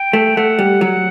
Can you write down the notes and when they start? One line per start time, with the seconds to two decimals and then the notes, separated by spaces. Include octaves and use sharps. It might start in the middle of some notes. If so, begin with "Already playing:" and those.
Already playing: G5
0.13 A3
0.37 A3 F#5
0.59 G3
0.81 F#3